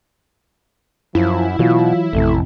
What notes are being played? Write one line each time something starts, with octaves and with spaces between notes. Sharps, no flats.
F#2 F3 E4
B2 E3 F#3 F4
A1 F2 C3 A3